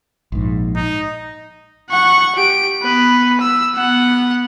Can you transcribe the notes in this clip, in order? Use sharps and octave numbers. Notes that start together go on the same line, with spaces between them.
A#1 G#2
D#4
F#5 C#6
G4 D7
B3 B4
E6
B3 F#5